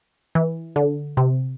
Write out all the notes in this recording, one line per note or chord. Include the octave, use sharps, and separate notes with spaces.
E3
D3
C3